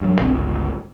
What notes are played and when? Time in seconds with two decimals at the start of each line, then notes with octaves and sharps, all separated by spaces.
0.01 G2 F#3
0.19 F#1 B1 D3 C4
0.32 G1 C#2